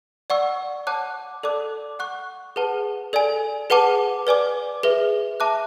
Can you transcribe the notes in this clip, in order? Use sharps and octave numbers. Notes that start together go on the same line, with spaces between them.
D5 F#5 C#6 E6
C#5 F#5 A5 D6 F#6
A4 D5 A5 D6 F#6
F#5 C#6 F#6
G#4 B4 F#5 A5
A4 D5 G#5
G#4 B4 F#5 A5 D6
B4 D5 G#5 D6
G#4 B4 E5
E5 A5 D6 F#6